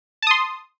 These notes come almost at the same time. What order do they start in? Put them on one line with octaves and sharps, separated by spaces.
A5 D#6 C6